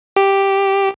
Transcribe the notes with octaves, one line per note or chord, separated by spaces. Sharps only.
G4